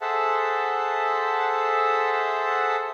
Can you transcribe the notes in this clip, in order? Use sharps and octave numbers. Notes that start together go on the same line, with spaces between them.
G#4 A4 C5 E5 F#5 A5